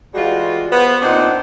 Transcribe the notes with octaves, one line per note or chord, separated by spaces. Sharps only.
E3 G3 G#3 F4 F#4
B3 C5
A#2 C4 D4 D#4 C5 F#5